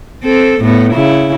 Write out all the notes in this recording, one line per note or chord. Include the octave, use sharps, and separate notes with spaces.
C4 A4
A2 B3
C#3 E4